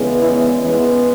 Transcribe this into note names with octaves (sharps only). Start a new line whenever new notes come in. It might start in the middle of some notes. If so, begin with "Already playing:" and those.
Already playing: E2 C#3 G#3 B3
E3 E4
E2 C#3 E3 G#3 B3 E4